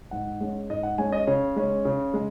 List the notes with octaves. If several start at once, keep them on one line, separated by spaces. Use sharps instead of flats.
G#2 F#5
G#3 C#4
G#2 D#5
F#5
G#3 C#4 G#5
D#5
C#3 C#5
G#3 C#4
C#3
G#3